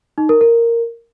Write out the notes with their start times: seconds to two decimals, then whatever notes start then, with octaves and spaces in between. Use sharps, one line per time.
0.18 D#4
0.29 A#4
0.41 A#4